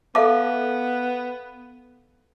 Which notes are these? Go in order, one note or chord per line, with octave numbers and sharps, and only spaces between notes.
B3 A4 E5 F5 A5 D6